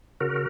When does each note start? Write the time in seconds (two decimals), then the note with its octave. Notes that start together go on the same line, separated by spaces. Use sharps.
0.20 C#3 F#4 A#4